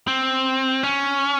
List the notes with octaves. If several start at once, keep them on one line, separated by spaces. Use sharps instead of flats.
C4
C#4